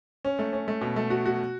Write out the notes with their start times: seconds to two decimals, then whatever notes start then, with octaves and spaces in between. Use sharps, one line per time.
0.25 C#4
0.39 A3
0.53 C#4
0.68 A3
0.81 B2
0.96 A3
1.10 F#4
1.26 F#4